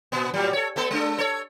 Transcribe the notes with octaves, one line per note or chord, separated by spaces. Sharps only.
A#2 B3
A2 F#3 G3
A4 C#5
A3 B3 A4
G#3 D4 A4
A4 C#5